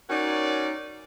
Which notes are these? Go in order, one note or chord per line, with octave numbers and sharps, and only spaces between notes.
C#4 D#4 F#4 A#4 C#5 D5